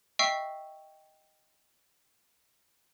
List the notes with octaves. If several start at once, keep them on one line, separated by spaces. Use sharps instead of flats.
D#5 E5 G5 C#6 E6 C7